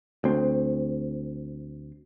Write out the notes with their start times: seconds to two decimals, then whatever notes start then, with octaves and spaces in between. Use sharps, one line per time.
0.24 D2 C4